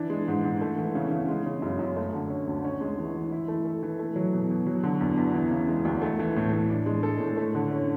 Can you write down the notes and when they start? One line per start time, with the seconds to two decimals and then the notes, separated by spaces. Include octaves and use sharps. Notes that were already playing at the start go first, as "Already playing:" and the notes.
Already playing: E3 D4
0.10 G#3
0.28 G#2
0.45 G#2
0.61 A3
0.78 E3
0.95 C#3
1.11 C#3
1.28 G#3
1.46 C#3
1.62 F#2
1.79 F#2
1.96 A3
2.13 D3
2.30 C#4
2.47 D2
2.64 C#4
2.81 G#3
2.98 E3
3.14 E3
3.32 E4
3.48 A3
3.65 A4
3.83 E3
3.99 A3
4.16 F#3
4.33 B2
4.50 B2
4.66 F#3
4.83 D3
5.01 E2
5.17 E2
5.34 E3
5.51 C#3
5.68 G#3
5.85 D2
6.02 A3
6.19 E3
6.36 A2
6.53 A2
6.70 D4
6.86 G#3
7.03 A4
7.20 A2
7.37 A3
7.55 D3
7.71 C#4